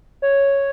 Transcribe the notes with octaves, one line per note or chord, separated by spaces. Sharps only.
C#5